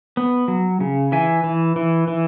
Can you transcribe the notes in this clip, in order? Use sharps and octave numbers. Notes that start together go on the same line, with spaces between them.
B3
F#3
C#3
E3 E5 G#5
E3
E3
E3